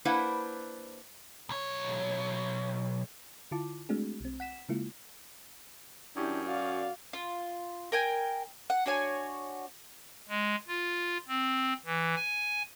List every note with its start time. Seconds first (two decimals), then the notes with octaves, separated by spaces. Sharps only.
0.05 A#3 D4 E4 B4 C5 F#5
1.49 B1 C#5
3.51 D3 E4 F4 A5 D6
3.89 G#3 A3 C4 D4 F#4 G#4
4.21 B1 C4
4.40 F#5 B6 E7
4.69 C#3 G#3 A#3 E4 F4
6.16 F#2 D4 E4 G4
6.47 F#4 D5 F5
7.13 F4
7.92 A#4 G5 G#5
8.70 F#5
8.86 D4 F#4 C#5 G#5
10.29 G#3
10.68 F4
11.28 C4
11.85 E3
12.16 G#5